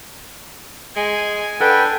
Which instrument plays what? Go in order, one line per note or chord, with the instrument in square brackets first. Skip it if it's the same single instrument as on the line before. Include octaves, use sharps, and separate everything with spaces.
[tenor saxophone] G#3 [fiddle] G#5
[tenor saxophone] D4 [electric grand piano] A4 F#5 A5 [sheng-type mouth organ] B4 G5